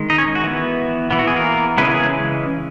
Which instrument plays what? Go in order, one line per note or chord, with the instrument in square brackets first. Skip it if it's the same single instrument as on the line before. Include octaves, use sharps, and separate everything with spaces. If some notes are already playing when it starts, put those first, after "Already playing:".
Already playing: [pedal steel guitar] D#3 G#3
D#4 D#5
C#4 C#5
F#4
E3 B3
E3 B3
F#4
G#4
A#3 A#4
C#3 E3 G#3 B3 C#4 B4
G#4